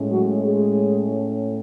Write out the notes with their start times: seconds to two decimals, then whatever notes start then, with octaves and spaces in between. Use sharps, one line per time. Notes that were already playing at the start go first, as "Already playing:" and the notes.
Already playing: A2 G#3 C#4
0.10 F#3 F#4
0.43 G#3 G#4